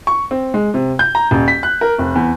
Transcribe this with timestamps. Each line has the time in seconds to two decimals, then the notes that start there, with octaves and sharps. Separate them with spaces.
0.07 C#6
0.31 C4
0.54 G#3
0.74 C3
0.99 G6
1.15 A#5
1.31 D#1
1.48 B6
1.63 F#6
1.81 A#4
1.98 F1
2.15 E2